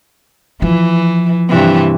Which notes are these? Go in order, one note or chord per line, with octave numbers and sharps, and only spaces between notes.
E3 F3
G2 C3 E3